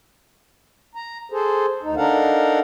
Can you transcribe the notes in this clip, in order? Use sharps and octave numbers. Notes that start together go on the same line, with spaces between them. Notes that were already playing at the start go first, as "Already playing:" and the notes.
A#5
G#4 A4 C5
D2 D#4
D4 D#4 A4 A#4 F5 F#5